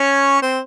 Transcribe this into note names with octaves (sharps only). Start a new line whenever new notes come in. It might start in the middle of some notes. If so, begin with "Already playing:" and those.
Already playing: C#4 C#5
C4 C5